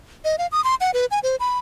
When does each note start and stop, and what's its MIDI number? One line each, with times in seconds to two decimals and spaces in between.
0.25 0.36 75
0.39 0.47 77
0.52 0.63 87
0.64 0.75 84
0.81 0.91 78
0.94 1.06 71
1.11 1.19 80
1.23 1.36 72
1.40 1.59 83